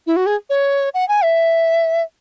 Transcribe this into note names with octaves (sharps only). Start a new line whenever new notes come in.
E4
F#4
G#4
C#5
F#5
G#5
E5